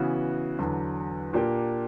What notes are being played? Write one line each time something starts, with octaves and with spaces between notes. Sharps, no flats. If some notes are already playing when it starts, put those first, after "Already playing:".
Already playing: C#3 E3 B3 F#4
E2 D3 F#3
A#2 A#3 D4 G4